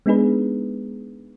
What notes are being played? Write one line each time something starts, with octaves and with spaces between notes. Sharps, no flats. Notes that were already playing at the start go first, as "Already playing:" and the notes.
G#3 B3 D4 D#4 G#4 B4